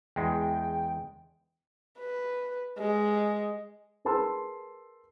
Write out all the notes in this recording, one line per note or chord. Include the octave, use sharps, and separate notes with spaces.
E2 G#3 G5
B4
G#3
G#4 A#4 B4 A5 C6 E6